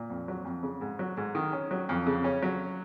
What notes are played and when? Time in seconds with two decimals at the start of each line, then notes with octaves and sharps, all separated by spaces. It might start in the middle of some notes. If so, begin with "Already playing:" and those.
Already playing: A#2
0.10 F2
0.28 F#3
0.45 F2
0.63 C#3
0.81 G#2
0.99 F#3
1.17 G#2
1.35 D#3
1.53 C#4
1.71 F#3
1.89 F2
2.07 C#3
2.24 C#4
2.43 F#3